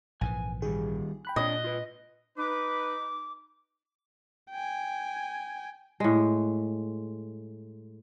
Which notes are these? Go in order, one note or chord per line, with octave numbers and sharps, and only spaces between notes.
A#1 G#2 E3 G#5
D#3 G3 G#4
G5 B5 F#6
A#2 D4 C#5 D#5
F4 B4
D#4 B4 D6
G5 G#5
A2 G#3